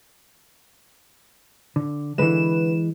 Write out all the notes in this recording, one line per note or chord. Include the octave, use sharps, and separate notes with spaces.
D3
D3 E3 G#3 B4 E7